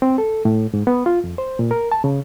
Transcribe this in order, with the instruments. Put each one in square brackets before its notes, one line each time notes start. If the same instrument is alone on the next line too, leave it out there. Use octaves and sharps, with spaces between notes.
[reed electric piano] C4
A4
A2
G#2
B3
F4
F2
C5
A#2
A#4
A5
C#3